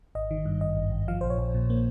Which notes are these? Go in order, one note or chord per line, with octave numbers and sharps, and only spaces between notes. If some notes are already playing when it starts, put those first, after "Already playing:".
G#1 D#5
D#3
G2
G#1 D#5
G#1
G#1
F3 F5
A#1 C5
C#5
A#1
A#2
A#3